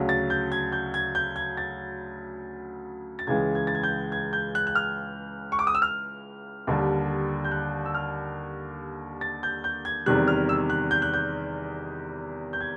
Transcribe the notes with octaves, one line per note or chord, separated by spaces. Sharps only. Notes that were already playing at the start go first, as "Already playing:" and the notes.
Already playing: D2 C#3 F#3
A6
G6
G#6
G6
G#6
G6
G#6
A6
A6
C#2 C#3 E3 G#3 G#6
G#6
A6
G#6
G6
G#6
G6
F#6
F#6
F6
C#6
D6
D#6
E6
F6
D#2 D3 G3
G6
F#6
E6
F6
A6
G6
G6
G#6
E2 C3 D#3 G3 F#6
F6
E6
F#6
G6
F#6
G6
G6
G#6